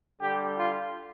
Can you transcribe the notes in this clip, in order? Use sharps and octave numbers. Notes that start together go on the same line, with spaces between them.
D3 G3 G4
F4